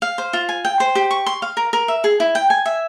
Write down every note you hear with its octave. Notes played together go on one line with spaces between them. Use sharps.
F5
C5
F4
G#5
G5
C5
G4
C#6
C6
F5
A#4
A#4
E5
G#4
E4
G5
G#5
E5